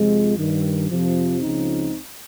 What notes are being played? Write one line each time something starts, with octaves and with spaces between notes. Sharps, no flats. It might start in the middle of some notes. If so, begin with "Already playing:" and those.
Already playing: F2 C3 F3 G#3
G2 D#3
F2 C3 F3
C#2 C#3 F3 C4 D#4